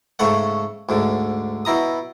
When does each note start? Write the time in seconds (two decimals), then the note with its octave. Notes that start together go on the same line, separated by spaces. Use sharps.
0.19 G#2 C#3 A3 C#5 F#5
0.89 D2 G#2 D3
1.65 B2 E4 A#5 D#6